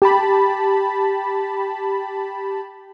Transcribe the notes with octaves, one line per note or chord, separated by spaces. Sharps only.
G4 A5 B5